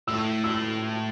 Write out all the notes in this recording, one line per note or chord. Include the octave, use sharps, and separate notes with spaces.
A2 E6
E6